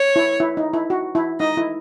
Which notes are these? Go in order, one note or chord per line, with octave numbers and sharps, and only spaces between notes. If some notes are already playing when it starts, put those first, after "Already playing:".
Already playing: C#5
E4
E4
D#4
E4
F#4
E4
D#4 D#5
E4